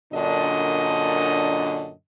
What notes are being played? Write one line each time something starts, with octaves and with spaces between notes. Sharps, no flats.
F#2 A#2 D3 D4 D#5